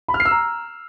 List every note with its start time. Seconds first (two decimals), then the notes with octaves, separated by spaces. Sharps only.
0.08 B5
0.14 F6
0.20 C7
0.25 E6
0.31 A#5